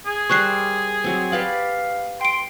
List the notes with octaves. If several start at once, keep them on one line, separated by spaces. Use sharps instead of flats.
G#4
G3 A#4 C5 C#6 F#6 C7
F#3 C4
G4 B4 D5 F5
G5 C6 D7